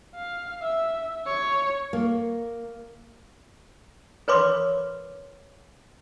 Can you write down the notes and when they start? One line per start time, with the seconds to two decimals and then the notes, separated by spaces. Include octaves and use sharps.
0.15 F5
0.63 E5
1.27 C#5
1.93 A#3
4.28 A#4 B4 C#5 B5 C6 D6